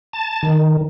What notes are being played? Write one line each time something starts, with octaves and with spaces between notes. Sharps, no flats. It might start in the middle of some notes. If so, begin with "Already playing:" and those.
A5
D#3